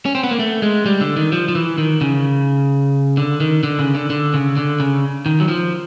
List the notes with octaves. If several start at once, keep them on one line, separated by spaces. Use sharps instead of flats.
C#4
C4
B3
A#3
A3
G#3
G3
D3
D#3
F3
F3
E3
D#3
C#3
D3
D#3
D3
C#3
D3
D3
C#3
D3
C#3
D#3
F#3
F3